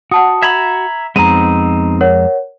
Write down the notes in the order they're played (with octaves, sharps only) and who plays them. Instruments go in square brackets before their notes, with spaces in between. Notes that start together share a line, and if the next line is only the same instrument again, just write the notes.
[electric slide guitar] F#4 [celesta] F#5 A5 D#6
[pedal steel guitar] E5 A#5 B5 [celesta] G#6
[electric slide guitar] F2 G#3 [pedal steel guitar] B3 C4 D#4 [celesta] A#5 D#7
[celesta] A#4 C#5 F#5